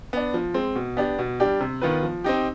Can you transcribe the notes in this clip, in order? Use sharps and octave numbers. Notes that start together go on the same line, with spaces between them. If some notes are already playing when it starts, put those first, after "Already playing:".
B3 D4
F3
G#3 C4
B2
B3 D4 G4
B2
G3 D4 G4
C3
D#3 B3 F4 B4
F3
C4 D#4 G4